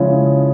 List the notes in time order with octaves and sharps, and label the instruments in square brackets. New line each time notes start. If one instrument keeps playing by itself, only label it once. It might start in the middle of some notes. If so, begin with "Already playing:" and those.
Already playing: [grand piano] C#3 F3 G#3 C#4 E4